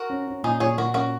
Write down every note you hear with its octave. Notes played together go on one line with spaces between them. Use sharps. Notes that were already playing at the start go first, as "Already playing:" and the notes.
Already playing: F#4 A#4
C#4
C#4
A#2 D#4 G#4
A#2 G#4 C#5
A#2 F#4 A#4
C#4 F#4 A#4